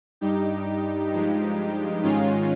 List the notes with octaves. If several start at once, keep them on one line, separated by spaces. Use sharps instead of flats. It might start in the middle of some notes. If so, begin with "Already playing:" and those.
G2 G3 D#4 G4
G2 F3 G#3
G#2 D#3 G#3 C#4 F4